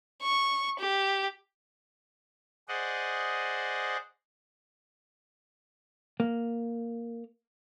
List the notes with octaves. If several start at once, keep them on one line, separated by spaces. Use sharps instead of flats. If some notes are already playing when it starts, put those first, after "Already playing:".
C#6
G4
G#4 C5 D5 D#5 F#5
A#3